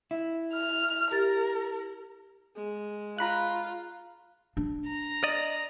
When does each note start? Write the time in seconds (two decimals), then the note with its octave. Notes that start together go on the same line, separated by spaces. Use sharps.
0.11 E4
0.54 F6
1.11 G4 A#4 A6
2.56 G#3
3.18 F4 A#5 B5 F#6
4.57 D4
4.86 A#5
5.24 D5 D#5